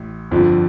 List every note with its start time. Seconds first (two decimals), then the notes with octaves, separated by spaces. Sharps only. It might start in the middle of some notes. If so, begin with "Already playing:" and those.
Already playing: A1 A2 A3
0.31 G1 F2 D3 F3